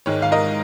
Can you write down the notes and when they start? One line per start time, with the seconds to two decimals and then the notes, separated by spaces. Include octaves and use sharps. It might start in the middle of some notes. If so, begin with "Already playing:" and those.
0.06 G#2 D#3 G#3 C#5
0.22 F5
0.32 A#4 D#5